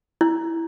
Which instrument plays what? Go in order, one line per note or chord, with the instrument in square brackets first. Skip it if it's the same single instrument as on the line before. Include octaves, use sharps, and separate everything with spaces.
[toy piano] E4